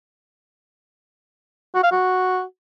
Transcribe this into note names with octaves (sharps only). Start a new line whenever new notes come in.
F#4
F5
F#4